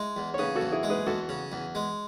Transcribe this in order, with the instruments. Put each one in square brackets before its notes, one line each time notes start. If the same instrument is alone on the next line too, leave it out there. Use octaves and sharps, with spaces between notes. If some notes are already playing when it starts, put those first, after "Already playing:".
Already playing: [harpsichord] G#3 [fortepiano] E4
[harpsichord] E2
[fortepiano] C#5
[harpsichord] C#3 [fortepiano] G#4 B4
[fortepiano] F#4 A4
[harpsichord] E2
[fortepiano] E4 G#4
[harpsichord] G#3
[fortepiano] G#4 B4
[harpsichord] E2 [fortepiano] F#4 A4
[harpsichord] C#3
E2
G#3